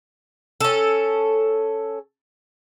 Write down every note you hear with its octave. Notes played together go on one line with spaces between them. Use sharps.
C#4 A4